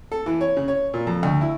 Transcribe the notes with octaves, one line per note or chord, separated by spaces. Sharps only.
A4
E3
C#5
C#3
C#5
A#2
F2
D2
E4